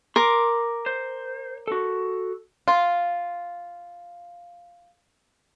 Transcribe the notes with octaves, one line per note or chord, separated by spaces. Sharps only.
A#4 C6 D6
C5
F#4 A4
F4 F5